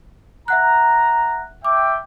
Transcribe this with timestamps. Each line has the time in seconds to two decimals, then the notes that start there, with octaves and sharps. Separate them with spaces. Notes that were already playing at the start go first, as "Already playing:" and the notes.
0.48 E5 F#5 A#5 F#6
1.65 E5 G5 D6